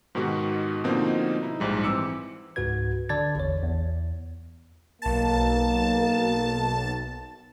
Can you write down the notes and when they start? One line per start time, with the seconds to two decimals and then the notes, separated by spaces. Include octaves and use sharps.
0.15 G#2 B2 D#3 B3 F#4 G4
0.84 B2 D3 F3 A#3 C4 D#4
1.42 D#4 E4
1.60 A#1 G#2 G3
1.84 E3 C4 D6 E6 C#7
2.56 C#2 G#2 F#4 B4 G#6
3.09 D3 D5 A5 G#6 A6
3.35 A1 E2 C#5
3.63 E2
5.02 B1 A#3 A5